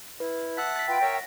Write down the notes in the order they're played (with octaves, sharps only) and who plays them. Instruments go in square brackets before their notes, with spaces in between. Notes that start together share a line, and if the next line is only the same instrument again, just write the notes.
[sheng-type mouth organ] E4 [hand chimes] B4
[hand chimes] E5 E6 B6 [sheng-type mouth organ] F#5 A5 F#6
[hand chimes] A6 B6
[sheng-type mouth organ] F4 B4 B5 [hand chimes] F#5 [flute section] G5
[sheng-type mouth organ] A#4 C#5 E5 [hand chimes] A#6